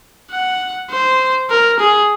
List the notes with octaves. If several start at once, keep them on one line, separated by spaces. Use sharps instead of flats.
F#5
C5
A#4
G#4